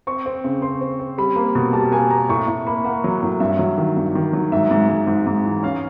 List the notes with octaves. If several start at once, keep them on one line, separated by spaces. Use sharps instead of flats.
C4 C#6
C4
C#3
C4 C6
C4
C4
G3 B5
A#3
B2
G3 A5
A#3 G#5
A#3 A#5
A2 C#6
A2
A#3 B5
A#3 F#5
F#3
A2
G2 E5
F#3
D#3
G2
D#3
F#3
G#2 E5
G#2
G#2
G#2
G#2
E3
C#4 F5